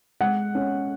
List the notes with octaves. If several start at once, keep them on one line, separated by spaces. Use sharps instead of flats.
G#3 F#5
C#4